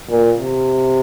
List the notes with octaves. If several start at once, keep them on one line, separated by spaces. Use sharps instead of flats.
A#2
C3